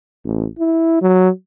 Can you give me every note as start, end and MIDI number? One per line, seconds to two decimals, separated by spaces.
0.25 0.46 33
0.59 0.98 64
1.01 1.29 54